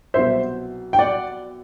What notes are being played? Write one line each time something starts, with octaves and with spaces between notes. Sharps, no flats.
C2 B2 F#3 C5 E5
G5
D5 F#5